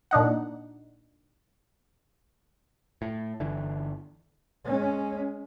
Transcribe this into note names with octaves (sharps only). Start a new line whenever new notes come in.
A#2 D4 D#4 F#5
A2
G1 D3 E3
G#3 C#4